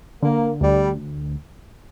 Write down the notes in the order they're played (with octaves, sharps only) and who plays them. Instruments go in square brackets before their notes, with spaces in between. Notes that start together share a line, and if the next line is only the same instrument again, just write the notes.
[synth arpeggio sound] D3 [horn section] A#3
[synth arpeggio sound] D2 [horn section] G3